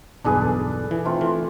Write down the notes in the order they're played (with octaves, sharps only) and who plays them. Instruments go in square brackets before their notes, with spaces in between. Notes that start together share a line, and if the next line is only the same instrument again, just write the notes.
[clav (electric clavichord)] B1 E2 G2 [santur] D4 G#4 B4
[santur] A4
[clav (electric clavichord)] E3
[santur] A3 C4 F4
[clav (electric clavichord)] E3